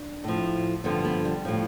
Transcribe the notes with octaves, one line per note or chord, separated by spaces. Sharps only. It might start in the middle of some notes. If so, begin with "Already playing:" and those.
Already playing: D4
A2 F3
G2 D3 F3 B3
B3
G3
A2 F3